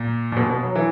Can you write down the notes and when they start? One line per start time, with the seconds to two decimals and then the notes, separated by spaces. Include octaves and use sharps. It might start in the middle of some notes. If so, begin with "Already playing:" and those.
Already playing: A#2
0.32 A#2
0.37 B2
0.50 B2
0.63 F#3
0.75 E3